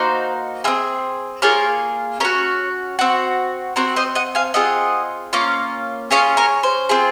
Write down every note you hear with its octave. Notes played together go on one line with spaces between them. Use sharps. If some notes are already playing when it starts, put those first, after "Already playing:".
Already playing: A#3 D#4 F#4 C5
C4 F4 G#4
A#3 F4 G#4 A#4 C#5
C#4 F#4 A#4 C#5
C4 F#4
C4 F#4 A#4 C#5
C5 D#5
D#5 F#5
F5 G#5
C4 F4 G#4 D#5 F#5
A#3 C#4 F4
C#4 F4 G#4 C#5 F5
A#4 C#5
C5
C4 F4 G#4